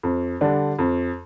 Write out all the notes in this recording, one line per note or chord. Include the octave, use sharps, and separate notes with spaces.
F2
D3 G3 D4
F2